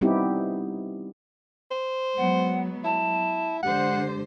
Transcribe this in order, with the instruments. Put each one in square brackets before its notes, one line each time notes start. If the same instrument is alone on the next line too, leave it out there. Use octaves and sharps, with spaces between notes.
[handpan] G3 B3 C4 D#4 E4 G4
[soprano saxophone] C5
[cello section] F#3 G#3 B3 [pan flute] F#5
[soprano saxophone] E4 [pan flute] A5
[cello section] D3 G#3 C5 [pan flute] G4 [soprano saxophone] F#5